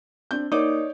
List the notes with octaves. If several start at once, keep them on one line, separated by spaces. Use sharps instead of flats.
C4 D4 G6
A#3 D#4 C#5 D5 D6